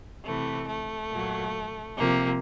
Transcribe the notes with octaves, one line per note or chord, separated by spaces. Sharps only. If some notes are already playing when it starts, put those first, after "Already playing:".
C3 E3 A3
A3
A#2 F#3
C3 F3 A#3